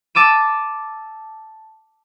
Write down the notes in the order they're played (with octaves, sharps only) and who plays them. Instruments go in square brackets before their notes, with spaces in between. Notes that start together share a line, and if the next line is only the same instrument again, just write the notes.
[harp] A5 D6 E6 D#7